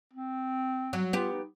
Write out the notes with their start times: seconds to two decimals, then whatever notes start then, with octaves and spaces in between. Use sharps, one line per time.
0.13 C4
0.93 F#3
1.13 B3 F4 G4
1.32 D#4